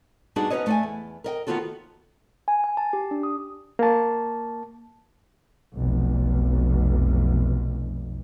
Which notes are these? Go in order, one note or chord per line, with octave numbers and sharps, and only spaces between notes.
G3 B3 D4 D#4 F#4 G#4
B3 C#4 D#4 B4 C#5 D#5
A3 D5 G#5
E2
A#4 D#5 G5
D#3 E3 B3 F4 F#4 A4
G#5
G#5
A5
G4
D4
D#6
A#3 A5
F1 B1